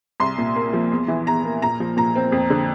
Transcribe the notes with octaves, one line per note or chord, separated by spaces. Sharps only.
C2 C6
A#2
A#3
F3
E2
E3
E2 A#5
A#3
A#2 A#5
F3
A#2 A#5
C4
F2
D3